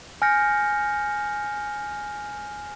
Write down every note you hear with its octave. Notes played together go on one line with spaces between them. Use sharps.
G#5 F6 G6 A#6 C#7